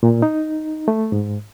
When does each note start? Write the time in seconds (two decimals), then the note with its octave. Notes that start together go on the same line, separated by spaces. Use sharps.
0.03 A#2
0.22 D#4
0.88 A3
1.12 G#2